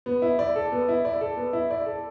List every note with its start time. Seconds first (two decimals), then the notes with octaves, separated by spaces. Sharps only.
0.06 B3
0.22 E4
0.39 D5
0.56 A4
0.72 B3
0.89 E4
1.05 D5
1.21 A4
1.37 B3
1.53 E4
1.71 D5
1.86 A4